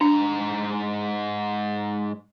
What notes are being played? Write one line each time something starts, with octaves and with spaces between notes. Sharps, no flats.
G#2 D4 A#5